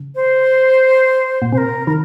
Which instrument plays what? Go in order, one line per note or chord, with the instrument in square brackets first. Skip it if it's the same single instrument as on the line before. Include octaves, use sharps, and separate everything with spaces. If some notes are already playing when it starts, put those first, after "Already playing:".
Already playing: [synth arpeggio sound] C#3
[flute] C5
[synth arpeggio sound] A#2
[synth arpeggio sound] C3 [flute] C5
[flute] A#4
[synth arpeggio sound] D#3 [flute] A#4